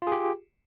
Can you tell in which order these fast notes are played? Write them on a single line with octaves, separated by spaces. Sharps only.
F4 G#4 G4